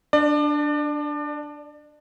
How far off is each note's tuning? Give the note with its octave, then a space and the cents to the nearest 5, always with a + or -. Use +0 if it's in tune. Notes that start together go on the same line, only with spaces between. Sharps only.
D4 +0 D5 +30